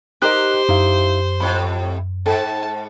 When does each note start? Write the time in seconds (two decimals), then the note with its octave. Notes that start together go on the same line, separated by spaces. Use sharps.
0.22 D#4 G4 A#4 C5 D#5 F#6
0.69 F#2 D#4 E4 F5
1.40 F2 A2 B5
2.26 G#2 A4 G5 A5